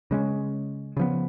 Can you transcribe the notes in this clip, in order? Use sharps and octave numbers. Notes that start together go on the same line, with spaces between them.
C#3 G#3 C#4
C#3 F3 B3